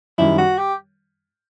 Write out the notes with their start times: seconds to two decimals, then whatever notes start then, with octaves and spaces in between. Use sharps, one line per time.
0.18 F#2 D#3 G3 E4
0.38 F#4
0.58 G4